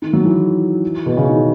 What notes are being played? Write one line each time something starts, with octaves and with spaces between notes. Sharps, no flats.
D#3
F#3
E3
B2
C#3
D#3